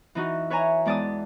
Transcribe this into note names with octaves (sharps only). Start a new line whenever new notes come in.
E3 D#4 F#4
B4 C#5 E5 G#5 A#5
E2 G#3 D5 A5 D#6